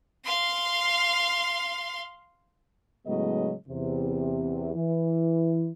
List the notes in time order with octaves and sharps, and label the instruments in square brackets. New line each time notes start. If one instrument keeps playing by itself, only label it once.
[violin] F5 C6
[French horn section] A2 C#3 F#3 G#3 B3 D#5
E2 C3
E3